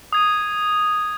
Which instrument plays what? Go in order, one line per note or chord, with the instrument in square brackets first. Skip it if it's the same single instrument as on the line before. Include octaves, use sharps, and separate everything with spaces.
[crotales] D#6 G#6 D#7